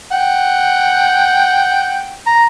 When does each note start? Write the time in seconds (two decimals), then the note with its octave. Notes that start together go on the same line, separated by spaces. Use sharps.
0.12 F#5 G5
2.27 A#5